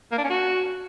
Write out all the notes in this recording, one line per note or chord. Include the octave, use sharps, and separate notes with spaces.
A#3
D4
C#4
F#4